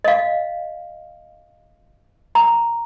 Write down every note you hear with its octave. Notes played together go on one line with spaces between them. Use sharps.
D#5 F5
A#5